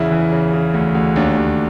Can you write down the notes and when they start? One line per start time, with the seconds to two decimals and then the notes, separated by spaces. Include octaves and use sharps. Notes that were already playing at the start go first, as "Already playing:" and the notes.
Already playing: E2 C#3 E4
0.11 E3
0.32 C#3
0.53 C#3
0.74 D2
0.95 D2
1.16 D#2 D4
1.37 D#2